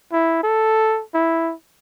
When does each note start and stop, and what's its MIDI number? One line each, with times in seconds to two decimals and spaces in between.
0.12 0.41 64
0.43 1.03 69
1.14 1.54 64